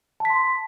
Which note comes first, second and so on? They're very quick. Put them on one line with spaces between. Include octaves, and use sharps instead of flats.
A5 B6 C6